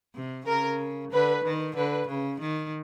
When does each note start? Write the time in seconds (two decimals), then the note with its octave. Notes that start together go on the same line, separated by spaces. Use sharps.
0.15 C3
0.47 C#3 A#4
1.12 D3 B4
1.45 D#3
1.76 D3 B4
2.08 C#3
2.41 D#3